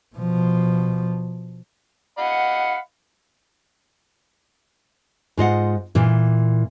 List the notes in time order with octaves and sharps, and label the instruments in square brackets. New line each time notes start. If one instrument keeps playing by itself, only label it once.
[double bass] B2 F3
[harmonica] D#5 F5 B5 [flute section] F#5
[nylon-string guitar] G#2 F4 D#5 F#5
A#2 E3